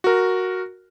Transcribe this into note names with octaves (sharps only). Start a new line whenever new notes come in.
F#4 A#4